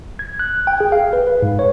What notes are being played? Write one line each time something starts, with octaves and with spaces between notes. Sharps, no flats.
G#6
F#6
G5
G#4
F5
B4
B4
G#2
C#5